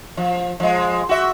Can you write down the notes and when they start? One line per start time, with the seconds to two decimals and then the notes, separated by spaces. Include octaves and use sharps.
0.17 F3
0.60 F3 G#3
1.09 F#4 E5